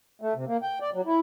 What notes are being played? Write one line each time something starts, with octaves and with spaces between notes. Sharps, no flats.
A3
C3
A#3
G5
D5
F#3
E4